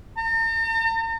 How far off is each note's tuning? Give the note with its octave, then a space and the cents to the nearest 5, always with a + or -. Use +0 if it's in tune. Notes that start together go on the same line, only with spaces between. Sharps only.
A#5 -45